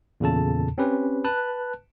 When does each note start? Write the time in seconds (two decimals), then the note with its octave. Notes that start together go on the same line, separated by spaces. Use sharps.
0.20 E2 A#2 C#3 A4 A5
0.78 C4 C#4 G4 B4
1.24 B4 A5 F#6